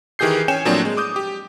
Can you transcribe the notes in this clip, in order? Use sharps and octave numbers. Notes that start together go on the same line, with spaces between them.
D#3 E3 G4 G#4 G6 C7
C#4 C#5 G5 G#5 G6 E7
A2 F3 F#3 A#3 C4 D4
G#3
D6 D#6 G6
G4